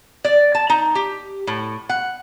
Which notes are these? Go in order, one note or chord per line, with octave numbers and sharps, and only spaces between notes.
D5
A5
D#4
G4
A2
F#5